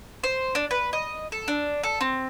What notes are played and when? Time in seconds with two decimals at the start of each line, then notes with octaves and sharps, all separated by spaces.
0.23 C5
0.55 D4
0.71 B4
0.93 D#5
1.32 A4
1.48 D4
1.83 A4
2.01 C4